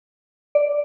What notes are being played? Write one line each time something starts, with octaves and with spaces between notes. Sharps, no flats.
D5